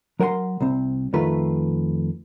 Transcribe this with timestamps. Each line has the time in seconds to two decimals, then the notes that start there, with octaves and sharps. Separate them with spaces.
0.19 F#3 A#4 F#5 G#5 C6
0.61 C2 C4
1.13 F2 D#3 A3 F4 B4